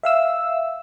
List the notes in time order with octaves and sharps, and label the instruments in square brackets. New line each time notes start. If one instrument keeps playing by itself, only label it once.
[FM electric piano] E5 F5 E6